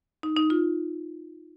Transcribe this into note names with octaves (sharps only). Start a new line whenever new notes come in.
D#4
D#4
F4